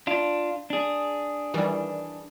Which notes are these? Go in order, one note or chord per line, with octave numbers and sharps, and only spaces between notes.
D4 F4
D4 G#4
D#3 E3 G3